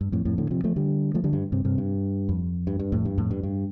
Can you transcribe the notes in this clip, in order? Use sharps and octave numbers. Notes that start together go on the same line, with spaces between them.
G2
F2 A2
F2 A2
A2 D3
C3 F3
F3 A3
D3 G3
F3 A3
D3 G3
G2
G2 C3
G2 C3
G2
F2
G2
G2
F2 A2
G2
F2 A2
G2
G2